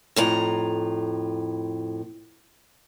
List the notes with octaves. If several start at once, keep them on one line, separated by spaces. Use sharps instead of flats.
F2 A2 A#5